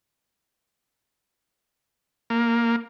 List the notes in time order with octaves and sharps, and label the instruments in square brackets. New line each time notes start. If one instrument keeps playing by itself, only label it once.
[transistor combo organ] A#3